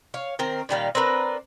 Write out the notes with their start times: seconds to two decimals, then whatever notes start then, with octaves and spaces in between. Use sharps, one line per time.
0.14 C#5 F5
0.39 D#3 C4 A#4
0.69 A#2 D#3 G3 F5
0.95 C4 D4 A#4 B4